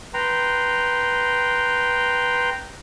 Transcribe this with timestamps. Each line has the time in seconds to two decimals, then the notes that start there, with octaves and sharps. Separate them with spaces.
0.14 B4 G5 A#5 C6